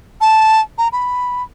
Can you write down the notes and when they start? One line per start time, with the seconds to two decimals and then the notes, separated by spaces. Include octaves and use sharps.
0.21 A5
0.78 A#5
0.92 B5